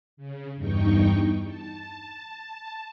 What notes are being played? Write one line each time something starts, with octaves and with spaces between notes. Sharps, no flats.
C#3
E2 G2 D#4 G5 C#6
A5